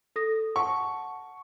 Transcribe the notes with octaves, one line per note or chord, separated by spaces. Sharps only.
A4 D#6 A#6
F#5 A5 C#6